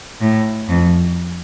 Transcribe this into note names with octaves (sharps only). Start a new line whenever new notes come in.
A2
F2